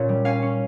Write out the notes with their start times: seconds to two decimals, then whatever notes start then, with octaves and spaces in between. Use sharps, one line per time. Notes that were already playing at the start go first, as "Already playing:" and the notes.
Already playing: A#2 C#4 F4
0.09 G3
0.25 C#4 F5 G#5
0.43 C#4